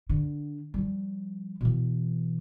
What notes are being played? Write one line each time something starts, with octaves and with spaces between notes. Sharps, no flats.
D3
F3 G3
B2 E3